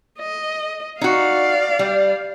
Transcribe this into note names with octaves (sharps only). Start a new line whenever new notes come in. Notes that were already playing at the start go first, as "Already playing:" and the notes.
D#5
D#4 F#4 D5 F5
G3